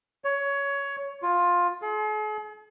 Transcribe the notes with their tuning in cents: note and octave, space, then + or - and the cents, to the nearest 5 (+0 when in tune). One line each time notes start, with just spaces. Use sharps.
C#5 +15
F4 +10
G#4 +45